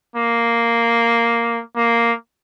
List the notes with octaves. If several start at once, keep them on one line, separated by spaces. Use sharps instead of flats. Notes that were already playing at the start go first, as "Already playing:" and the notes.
A#3
A#3